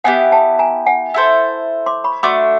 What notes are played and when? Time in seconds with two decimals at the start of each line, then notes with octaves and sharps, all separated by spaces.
0.04 B3 E4 G4 F#5 G#5
0.32 G5 A5
0.59 G#5 A#5
0.86 F#5 G#5
1.14 E4 A4 C5
1.86 C6 D6
2.04 B5 C#6
2.23 A3 D4 F#4 C6 D6